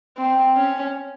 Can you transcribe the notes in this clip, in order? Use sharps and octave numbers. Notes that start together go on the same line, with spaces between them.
C4
C#4